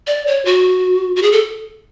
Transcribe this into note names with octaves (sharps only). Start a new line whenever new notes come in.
D5
C#5
F#4
F#4
G#4
A4